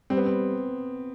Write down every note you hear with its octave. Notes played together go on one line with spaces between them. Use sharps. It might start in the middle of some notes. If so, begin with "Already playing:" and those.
G3 C4
B3
C4